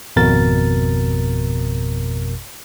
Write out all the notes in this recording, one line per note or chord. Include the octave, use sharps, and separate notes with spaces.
G#1 F2 B2 A#4 A6